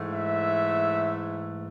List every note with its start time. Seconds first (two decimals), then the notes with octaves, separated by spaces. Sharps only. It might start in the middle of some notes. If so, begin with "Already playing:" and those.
Already playing: G#2 E3 A3
0.08 E5